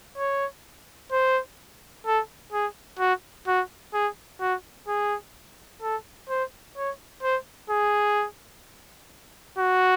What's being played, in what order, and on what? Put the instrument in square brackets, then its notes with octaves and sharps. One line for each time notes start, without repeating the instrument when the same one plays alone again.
[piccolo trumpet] C#5
C5
A4
G#4
F#4
F#4
G#4
F#4
G#4
A4
C5
C#5
C5
G#4
F#4